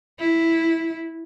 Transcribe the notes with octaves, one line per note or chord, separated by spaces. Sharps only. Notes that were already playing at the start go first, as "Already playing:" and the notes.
E4